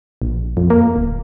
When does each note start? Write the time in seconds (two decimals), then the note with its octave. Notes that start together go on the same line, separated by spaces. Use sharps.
0.22 A#1
0.57 F2
0.70 A#3
0.96 D1